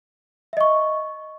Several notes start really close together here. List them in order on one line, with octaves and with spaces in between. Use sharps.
E5 D#5 C#6